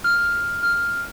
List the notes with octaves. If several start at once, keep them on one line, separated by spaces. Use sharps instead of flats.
F6
F6